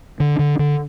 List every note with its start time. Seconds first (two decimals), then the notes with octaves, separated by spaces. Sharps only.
0.20 D3
0.39 D3
0.59 D3